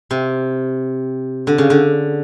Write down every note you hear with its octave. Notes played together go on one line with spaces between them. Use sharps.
C3
D3
C#3
D3